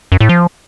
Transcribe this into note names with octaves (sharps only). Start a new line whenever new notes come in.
F#2
A2
F3